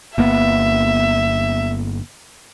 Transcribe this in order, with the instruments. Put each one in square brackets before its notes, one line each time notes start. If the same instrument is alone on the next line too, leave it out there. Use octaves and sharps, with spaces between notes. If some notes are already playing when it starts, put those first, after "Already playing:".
[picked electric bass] G1 A#3 B3 [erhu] E5